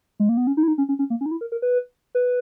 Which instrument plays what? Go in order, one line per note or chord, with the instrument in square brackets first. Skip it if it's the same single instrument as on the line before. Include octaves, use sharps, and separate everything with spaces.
[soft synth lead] G#3
A#3
B3
C#4
D#4
E4
D#4
C#4
C#4
C#4
A#3
C#4
D#4
E4
A#4
A#4
B4
B4